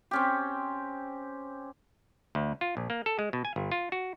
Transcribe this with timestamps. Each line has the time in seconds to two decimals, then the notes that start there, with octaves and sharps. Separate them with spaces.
0.11 C4 C#4 G4
2.35 D2
2.61 F4
2.77 A#1
2.90 A#3
3.06 A4
3.19 G#3
3.33 B2
3.45 G#5
3.56 G1
3.72 F4
3.92 F#4